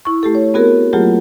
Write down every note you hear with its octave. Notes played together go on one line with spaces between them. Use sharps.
E4 C#6
A3 G4 A4
C#5
B3 C4 F#4 G#4 A#4
F#3 A3 A#3 F4 G4 G#4